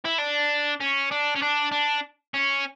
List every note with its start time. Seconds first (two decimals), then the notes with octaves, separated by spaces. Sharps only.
0.05 E4
0.18 D4
0.80 C#4
1.11 D4
1.35 C#4
1.42 D4
1.72 D4
2.34 C#4